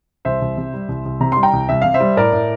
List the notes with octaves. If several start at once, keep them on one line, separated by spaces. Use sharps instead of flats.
C2 C5 E5
C2
C3
G3
C2
C2
C3 A#5
G3 C6
G5 A#5
C2
C2 E5
C3 F5
C5 E5
G3
A2 A#4 D5
A2